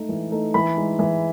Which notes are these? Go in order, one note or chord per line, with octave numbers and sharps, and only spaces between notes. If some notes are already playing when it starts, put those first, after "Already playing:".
Already playing: A3 D#4
E3
A3 D#4
E3 B5
G#3 D#4
E3